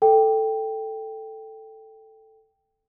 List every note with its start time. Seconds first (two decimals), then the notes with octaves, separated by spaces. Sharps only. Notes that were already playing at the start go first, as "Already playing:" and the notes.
0.02 A4 G5